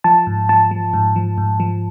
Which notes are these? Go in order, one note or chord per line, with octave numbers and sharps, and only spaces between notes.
F3 A5
G#2
F3 A5
F3
G#2
F3
G#2
F3